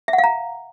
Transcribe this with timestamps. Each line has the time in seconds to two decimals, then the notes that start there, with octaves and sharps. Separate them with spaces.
0.08 E5
0.13 F#5
0.18 F5
0.24 A#5